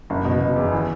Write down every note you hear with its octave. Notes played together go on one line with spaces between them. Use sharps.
F#1
B2
B2
E2
E3